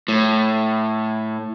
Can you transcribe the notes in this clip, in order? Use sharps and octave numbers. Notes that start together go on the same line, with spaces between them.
A2